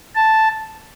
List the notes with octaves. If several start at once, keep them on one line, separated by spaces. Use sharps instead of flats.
A5